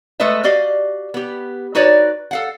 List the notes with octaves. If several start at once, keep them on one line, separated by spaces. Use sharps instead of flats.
G#3 A3 A4 B4 D#5 E5
F#4 G4 D5 D#5 F5
B3 G4
D#4 F#4 B4 C#5 D5
A4 F5 F#5